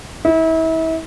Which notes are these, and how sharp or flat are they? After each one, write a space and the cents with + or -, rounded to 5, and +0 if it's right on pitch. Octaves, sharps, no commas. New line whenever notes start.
E4 -35